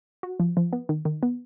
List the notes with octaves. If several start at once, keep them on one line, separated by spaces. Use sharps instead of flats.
F#4
F3
F3
B3
D#3
D#3
B3